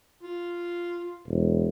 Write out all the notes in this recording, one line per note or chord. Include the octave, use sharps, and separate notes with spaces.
F4
E1